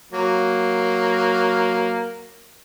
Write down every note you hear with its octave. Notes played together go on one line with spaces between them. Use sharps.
F#3 A#3